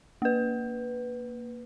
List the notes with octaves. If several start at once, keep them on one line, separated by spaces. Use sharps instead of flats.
A#3 B4